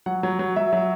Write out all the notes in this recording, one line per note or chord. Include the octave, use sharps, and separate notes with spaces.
F#3 F#5
F#3
F#3
F#3 E5
F#3